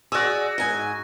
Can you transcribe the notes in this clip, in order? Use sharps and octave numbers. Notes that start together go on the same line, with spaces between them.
F#4 G#4 D5 E6
G#2 G#5